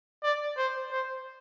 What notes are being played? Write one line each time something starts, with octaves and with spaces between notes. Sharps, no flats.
D5
C5
C5